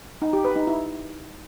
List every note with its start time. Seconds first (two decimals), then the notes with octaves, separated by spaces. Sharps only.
0.22 D#4
0.33 G4
0.45 B4
0.56 D#4
0.67 E4